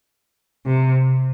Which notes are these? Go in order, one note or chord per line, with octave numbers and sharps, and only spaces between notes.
C3